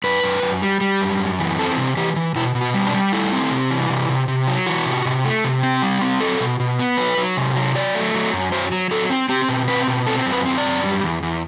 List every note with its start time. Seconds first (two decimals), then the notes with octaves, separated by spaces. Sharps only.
0.04 F#2 B4
0.23 F#2
0.42 F#2
0.62 G3
0.81 G3
1.01 F#2
1.20 F#2
1.39 E3
1.59 C4 A4
1.78 C3
1.97 E3 G4
2.16 E3
2.35 B2 E4
2.55 B2
2.61 F#4
2.74 G3
2.87 D4
2.94 G3
3.13 A3 E4
3.32 C4
3.51 C3
3.70 E3
3.90 C3
4.09 C3
4.28 C3
4.48 F#3
4.67 E3 F#4
4.86 C3
5.05 C3
5.25 A3
5.44 C3
5.63 C4
5.82 G3
6.02 C4
6.21 F#3 A4
6.40 B2
6.60 B2
6.79 B3
6.98 F#3 B4
7.18 F#3
7.37 C3
7.56 F#3
7.75 F#3 D5
7.94 A3
8.14 F#3
8.33 F#2
8.52 F#3 C5
8.72 F#3
8.91 F#3 A4
9.10 C4
9.29 C4 G4
9.49 B2
9.68 C4 B4
9.87 B2
10.06 C4 A4
10.26 F#2
10.32 B4
10.45 C4
10.58 D5
10.65 F#2
10.84 G3
11.03 E2
11.23 E2